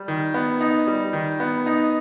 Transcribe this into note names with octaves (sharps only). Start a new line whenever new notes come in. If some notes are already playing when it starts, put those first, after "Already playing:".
Already playing: G3
D#3
B3
D#4
G3
D#3
B3
D#4